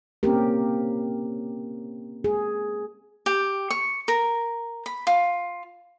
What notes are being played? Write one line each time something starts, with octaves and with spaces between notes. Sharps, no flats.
A#3 C4 C#4 G4 A#4
G#4
G4
C#6
A#4
B5
F4